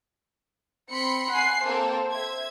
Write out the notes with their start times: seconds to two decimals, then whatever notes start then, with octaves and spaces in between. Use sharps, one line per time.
0.90 C4 B5 C6 C#7
1.31 F#5 G#5 C7
1.63 A#3 C4 A4 C5
2.11 E5 G#6